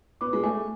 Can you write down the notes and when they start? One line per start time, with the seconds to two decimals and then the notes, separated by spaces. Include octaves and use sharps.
0.21 B3 D6
0.33 G#3
0.43 A3 G#5